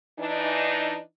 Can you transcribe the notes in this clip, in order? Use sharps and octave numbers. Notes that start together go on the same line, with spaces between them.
E3 D4 D#4